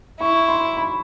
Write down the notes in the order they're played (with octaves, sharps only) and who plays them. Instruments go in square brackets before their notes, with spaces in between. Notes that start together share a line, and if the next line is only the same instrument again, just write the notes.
[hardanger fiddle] E4 [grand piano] C#6
[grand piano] C6
B5